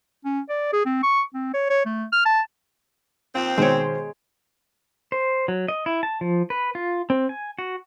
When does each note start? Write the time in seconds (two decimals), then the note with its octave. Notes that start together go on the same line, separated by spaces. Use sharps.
0.25 C#4
0.49 D5
0.73 G#4
0.85 C4
1.03 C#6
1.34 C4
1.54 C#5
1.70 C#5
1.86 A3
2.12 F6
2.25 A5
3.35 D#2 C4 F4
3.57 B2 D#3 G#3 C5 C#5 D7
5.12 C5
5.48 F#3
5.68 D#5
5.86 E4
6.03 A5
6.21 F3
6.50 B4
6.75 F4
7.10 C4
7.29 G#5
7.59 F#4